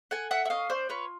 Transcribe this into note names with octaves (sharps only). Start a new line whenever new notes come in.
A4 F#5 G#5
E5 F#5
E5
C#4 D#5 F5
C5 D5
F4 B4 C#5